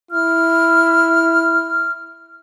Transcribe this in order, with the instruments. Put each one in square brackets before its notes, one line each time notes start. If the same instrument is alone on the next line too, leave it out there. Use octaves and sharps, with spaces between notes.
[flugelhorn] E4 [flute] F6